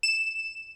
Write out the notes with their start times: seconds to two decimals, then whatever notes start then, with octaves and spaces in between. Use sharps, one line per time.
0.03 E7